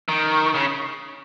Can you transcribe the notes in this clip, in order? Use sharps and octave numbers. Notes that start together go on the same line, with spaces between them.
D#3
C#3